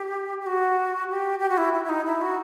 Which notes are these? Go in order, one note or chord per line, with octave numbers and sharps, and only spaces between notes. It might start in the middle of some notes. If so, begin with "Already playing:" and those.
Already playing: G4
G4
F#4
G4
G4
F#4
E4
E4
E4
D#4
E4
F#4